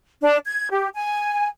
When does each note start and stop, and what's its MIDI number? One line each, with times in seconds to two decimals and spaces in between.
0.22 0.36 62
0.45 0.69 92
0.70 0.87 67
0.94 1.48 80